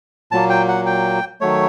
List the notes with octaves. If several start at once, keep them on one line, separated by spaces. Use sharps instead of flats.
A#2 F#3 A#3 A5
G5
F#5
G5
D#3 F#3 A3 C#5